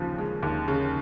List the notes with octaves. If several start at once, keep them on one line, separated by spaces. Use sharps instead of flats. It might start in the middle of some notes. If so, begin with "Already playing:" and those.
Already playing: D#2 C#3 F3
G#3
D#2
C#3